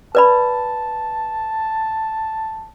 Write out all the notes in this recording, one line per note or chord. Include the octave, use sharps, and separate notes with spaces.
B4 D5 A5 B5